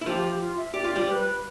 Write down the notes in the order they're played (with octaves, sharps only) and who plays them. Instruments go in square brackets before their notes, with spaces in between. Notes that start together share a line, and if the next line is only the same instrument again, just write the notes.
[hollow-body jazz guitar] E4
[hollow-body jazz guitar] F3 F4 [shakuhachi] G4
[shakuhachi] G4
F4
E5
[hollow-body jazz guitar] G4 [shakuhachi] D5
[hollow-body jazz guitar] F4
G3 G4
[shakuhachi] C5
B4